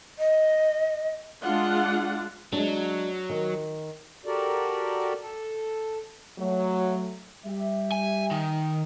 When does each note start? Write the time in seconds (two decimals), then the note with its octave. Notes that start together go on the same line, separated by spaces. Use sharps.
0.19 D#5
1.44 G#3 D4 F4 F#5
2.53 F#3 G#3 D4
3.30 D#3
4.26 F#4 G4 A4 A#4 D5
5.22 A4
6.38 F#3 A3
7.45 G3 G4 E5
7.92 G#5
8.31 D#3